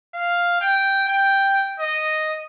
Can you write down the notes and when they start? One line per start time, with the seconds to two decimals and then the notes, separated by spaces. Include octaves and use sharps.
0.14 F5
0.61 G5
1.09 G5
1.80 D#5